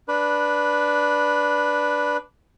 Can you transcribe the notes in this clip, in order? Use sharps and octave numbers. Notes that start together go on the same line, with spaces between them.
D4 B4